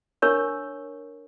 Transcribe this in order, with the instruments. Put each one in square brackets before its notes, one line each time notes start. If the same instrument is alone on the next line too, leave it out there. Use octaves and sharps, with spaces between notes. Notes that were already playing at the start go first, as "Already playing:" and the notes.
[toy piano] D4 A#4 C#5 C#6